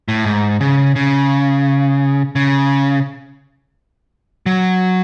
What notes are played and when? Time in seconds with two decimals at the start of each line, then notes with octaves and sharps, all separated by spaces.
0.08 A2
0.25 G#2
0.61 C#3
0.96 C#3
2.36 C#3
4.46 F#3